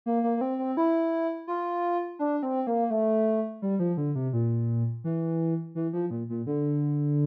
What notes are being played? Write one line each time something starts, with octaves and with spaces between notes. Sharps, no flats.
A#3
A#3
A#3
C4
C4
E4
F4
D4
C4
A#3
A3
G3
F3
D3
C3
A#2
E3
E3
F3
A#2
A#2
D3